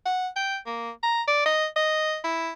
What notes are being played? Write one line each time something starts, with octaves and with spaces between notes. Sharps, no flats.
F#5
G5
A#3
A#5
D5
D#5
D#5
E4